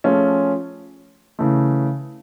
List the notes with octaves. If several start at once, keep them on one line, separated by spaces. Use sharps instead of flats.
F3 A3 C#4 F4 G#4
C#3 E3 A3